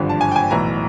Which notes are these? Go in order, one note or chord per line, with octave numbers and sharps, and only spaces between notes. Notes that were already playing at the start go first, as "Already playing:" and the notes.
Already playing: G#1 G2 D3 F3
A5
G#5
G5
G#5
B1 A2 E3 A#5